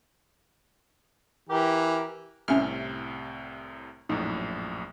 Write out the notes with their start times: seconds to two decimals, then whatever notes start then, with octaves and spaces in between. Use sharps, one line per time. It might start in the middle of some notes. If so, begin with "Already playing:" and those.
1.49 E3 G4 A#4
2.48 C2 A2 C3 C#4 E5 F6
4.09 A#1 F#2 A2 D#4